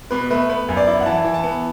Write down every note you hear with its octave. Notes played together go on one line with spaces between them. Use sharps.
B2 B4
A3 B4
B3 B4
F#2
D5
E4
F#5
E3 A5
E3
A5
B3